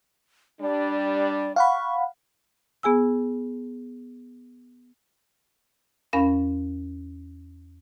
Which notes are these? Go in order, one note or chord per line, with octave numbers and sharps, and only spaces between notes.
G3 D4 D5
F5 F#5 B5 C#6
B3 G#4 G#5 E6
E2 C#4 A#4 F5 B5